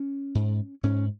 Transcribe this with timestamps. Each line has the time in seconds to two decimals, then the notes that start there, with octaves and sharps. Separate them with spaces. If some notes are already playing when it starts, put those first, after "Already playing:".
Already playing: C#4
0.35 G#2
0.83 G#2 C#4